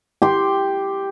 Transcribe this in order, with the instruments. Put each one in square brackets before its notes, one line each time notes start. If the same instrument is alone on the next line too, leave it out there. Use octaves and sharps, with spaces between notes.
[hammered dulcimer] G4 C6